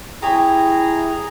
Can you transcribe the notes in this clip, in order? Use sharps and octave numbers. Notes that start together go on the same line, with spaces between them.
E4 G4 G#4 C#5 A#5